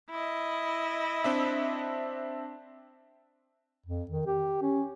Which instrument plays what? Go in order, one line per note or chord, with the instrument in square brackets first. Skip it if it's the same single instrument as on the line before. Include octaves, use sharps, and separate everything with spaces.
[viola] E4 D#5
[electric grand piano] C4 D4 E5
[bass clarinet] F2
D#3
G4
C#4